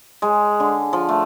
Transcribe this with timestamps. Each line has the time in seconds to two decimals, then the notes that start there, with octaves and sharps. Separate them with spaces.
0.22 G#3
0.60 D3
0.93 F3
1.09 A3